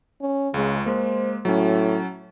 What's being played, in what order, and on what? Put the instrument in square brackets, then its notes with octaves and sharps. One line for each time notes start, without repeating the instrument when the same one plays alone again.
[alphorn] C#4
[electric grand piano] C#2 G#3 [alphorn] C#3
[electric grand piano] G#3 A#3 [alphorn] C5
[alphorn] A2 [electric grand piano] F#3 C#4